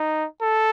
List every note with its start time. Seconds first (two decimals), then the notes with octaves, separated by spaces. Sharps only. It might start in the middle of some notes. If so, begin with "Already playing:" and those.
Already playing: D#4
0.41 A4